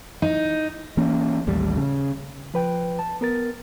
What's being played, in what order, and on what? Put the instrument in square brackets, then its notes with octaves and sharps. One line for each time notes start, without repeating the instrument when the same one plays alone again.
[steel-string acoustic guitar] D#4
[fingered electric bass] E3 A#3 C#4
A1 D#2 G3
C#3
[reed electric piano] F3 B4 G5
A5
B3 A#4 A6